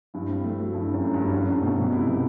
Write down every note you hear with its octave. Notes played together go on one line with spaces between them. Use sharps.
G2 E4
C4
A3
F#3
G2 E4
C4
F#2
A3
G2 F#3
F#2 E4
G2 C4
B2 A3
B2 F#3
C3 E4
B2 C4